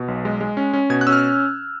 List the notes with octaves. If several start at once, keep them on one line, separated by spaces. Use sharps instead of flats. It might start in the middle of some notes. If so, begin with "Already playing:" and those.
Already playing: B2
B1
G#3
G#3
C#4
C#4
B2 G#6
F#6
C#4 E6
F6